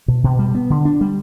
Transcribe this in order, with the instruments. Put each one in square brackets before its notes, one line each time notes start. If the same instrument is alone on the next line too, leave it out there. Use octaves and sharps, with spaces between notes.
[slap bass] B2
B2
G3
B3
D3
D4
G3